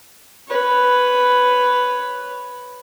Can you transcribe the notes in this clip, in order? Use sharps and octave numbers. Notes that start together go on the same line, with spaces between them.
B4 C#5